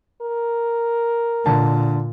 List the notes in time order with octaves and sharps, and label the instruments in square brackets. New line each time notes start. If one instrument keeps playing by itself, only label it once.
[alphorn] A#4
[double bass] A#2 [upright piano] D3 A5